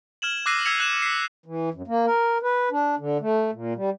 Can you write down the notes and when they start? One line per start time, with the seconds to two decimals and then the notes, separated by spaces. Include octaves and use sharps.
0.22 F6 G#6 E7 F#7
0.46 D6 E6 F#6 A#6 C7 D#7
0.65 E6 F6 G#6 B6 C#7 F7
0.80 F#6 C7 E7
1.02 B6 C7
1.46 E3
1.74 F#2
1.88 A#3
2.06 A#4
2.42 B4
2.71 D4
2.99 D3
3.21 A3
3.52 A#2
3.76 G3